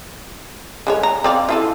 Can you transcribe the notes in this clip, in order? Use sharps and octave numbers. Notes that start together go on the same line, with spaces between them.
D3 G#3 C#5
A#5
C4 D5 F5
E4 F4 A4